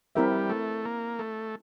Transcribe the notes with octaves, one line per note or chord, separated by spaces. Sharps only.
G3 C4 E4 A#4 E5
A3
A#3
A3